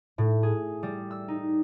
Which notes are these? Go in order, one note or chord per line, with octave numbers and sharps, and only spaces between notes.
A2
G#4
G3
E6
D#4